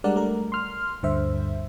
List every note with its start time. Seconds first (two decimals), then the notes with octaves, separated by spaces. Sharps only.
0.04 G3 G#3 D4 A#4 D5 F#5
0.16 A3 A#4
0.52 C6 F6
1.03 D2 G2 D3 C5 E5